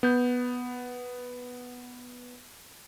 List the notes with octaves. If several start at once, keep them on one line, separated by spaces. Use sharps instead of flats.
B3 G6